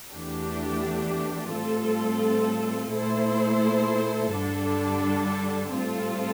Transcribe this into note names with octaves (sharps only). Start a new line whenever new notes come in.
E2 E3 A3 D4 G4
A2 G3 C4 F4 A4
A#2 A3 E4 A4 C5
G2 D3 G3 D4 A4
A2 G3 C4 F4 A4